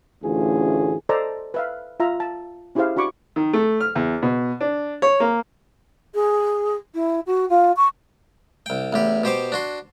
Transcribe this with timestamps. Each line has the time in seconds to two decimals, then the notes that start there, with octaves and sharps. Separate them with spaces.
0.23 A1 D2 E3 C#4 F4 G#4
1.09 A4 C5 D5 D#5 A5 A#5
1.54 B4 E5 F5
2.00 F4 E5 A#5
2.20 A5
2.75 C#4 E4 G4 G#4 C5 F5
2.96 D4 F#4 B5 C#6 D6
3.36 D#3
3.53 A3
3.81 F6
3.95 E2
4.22 B2
4.61 D4
5.02 C#5
5.20 A#3
6.14 G#4
6.94 E4
7.26 F#4
7.49 F4
7.76 C#6
8.66 C2 G5
8.93 A1 E2 G4
9.23 B2 G4 C5 D6
9.52 D4 F#4 C6